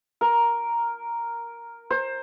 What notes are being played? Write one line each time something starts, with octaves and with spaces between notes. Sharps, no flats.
A#4
C5